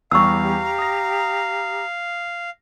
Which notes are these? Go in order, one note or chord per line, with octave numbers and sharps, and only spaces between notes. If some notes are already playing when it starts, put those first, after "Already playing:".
E2 G3 G4 F5 A#5 C#6 E6
D#6 A#6